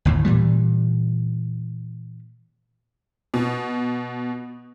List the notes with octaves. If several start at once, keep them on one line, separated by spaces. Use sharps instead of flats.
G1 D#2 A2
A#2 E3 G3
B2